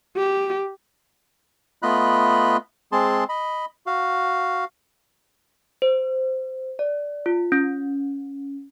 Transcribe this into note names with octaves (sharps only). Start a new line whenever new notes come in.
G4
A3 B3 F4 D#5 B5 F#6
G#3 C4 G#4 A5 C6
D#5 B5
F#4 F5
C5
D5
F4
C#4